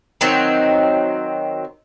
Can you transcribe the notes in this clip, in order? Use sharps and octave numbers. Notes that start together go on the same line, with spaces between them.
D#3 F#3 C4